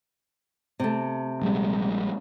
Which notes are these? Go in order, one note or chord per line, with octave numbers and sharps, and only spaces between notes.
C3 A3
A#1 G3 G#3